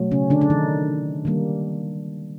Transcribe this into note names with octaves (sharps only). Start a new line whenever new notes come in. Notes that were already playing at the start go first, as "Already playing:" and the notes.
Already playing: B2 F#3 A3
C#3 C#4
D3 D4
D4
D#3 D#4
D#3 G3 A#3